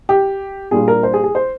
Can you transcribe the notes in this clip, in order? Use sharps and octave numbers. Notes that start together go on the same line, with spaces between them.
G4
A#2 G3 D4 F4 G#4
A#4
C5
G#4
G#4
C5